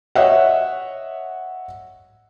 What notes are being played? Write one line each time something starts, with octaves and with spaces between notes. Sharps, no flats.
C#5 D#5 E5 F#5